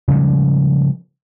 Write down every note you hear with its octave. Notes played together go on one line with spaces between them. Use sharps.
C#3 F3 G3 G#3